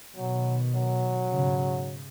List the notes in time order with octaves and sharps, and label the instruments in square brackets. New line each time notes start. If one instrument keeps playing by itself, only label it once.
[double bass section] B2 D#3 [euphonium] F#3
[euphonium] F#3
[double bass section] G#2 C#3